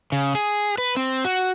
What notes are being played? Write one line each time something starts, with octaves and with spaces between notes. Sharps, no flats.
C#3
G#4
B4
C4
F#4